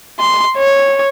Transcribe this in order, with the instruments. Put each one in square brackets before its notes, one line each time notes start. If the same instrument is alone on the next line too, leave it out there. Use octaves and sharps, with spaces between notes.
[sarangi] C6
C#5